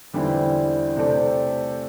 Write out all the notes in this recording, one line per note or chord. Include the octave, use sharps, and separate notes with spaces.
E2 D3 G3 C4 E4
C3 A3 C4 A4 D5